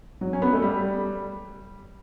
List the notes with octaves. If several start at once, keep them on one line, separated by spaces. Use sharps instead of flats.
F#3
C#4
B3
A3
G3